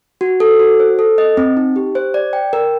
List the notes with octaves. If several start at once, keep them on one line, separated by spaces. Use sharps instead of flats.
F#4
A4
F#4
C5
A4
D#5
C4
D#4
G4
C5
D5
G5
A#4